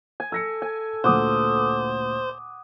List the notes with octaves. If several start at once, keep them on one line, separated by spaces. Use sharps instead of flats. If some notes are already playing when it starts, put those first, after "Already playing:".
G#5
A4 E6 A#6 C#7
G#5
D2 A#2 C5 F#5 D6 D#6